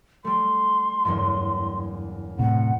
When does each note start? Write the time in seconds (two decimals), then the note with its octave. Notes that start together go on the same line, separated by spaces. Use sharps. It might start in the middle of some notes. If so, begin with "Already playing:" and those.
0.25 G3 A3 C6
1.05 F#1 E2 G2
2.39 A2 C3 F#5